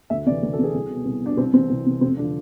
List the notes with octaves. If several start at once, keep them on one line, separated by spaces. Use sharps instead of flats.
D2 E5
C3 E3 D5
D2
A4
C3 E3 G#4
C2
B2
C2
B2 D4
C2 C4
C3 E3 C4
C2
C3 E3
F1 C4
D4
D3 F3